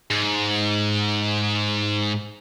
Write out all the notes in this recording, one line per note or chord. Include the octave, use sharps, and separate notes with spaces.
G#2